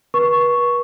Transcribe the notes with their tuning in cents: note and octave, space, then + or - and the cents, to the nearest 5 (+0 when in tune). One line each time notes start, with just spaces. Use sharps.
B4 -35 C#6 +0